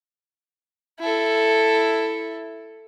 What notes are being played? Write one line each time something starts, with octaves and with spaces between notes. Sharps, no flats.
E4 A4